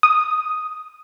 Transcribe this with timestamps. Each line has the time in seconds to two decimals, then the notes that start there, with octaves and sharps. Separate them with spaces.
0.03 D#6